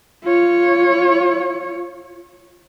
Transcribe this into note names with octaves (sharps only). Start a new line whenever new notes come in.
F4 C#5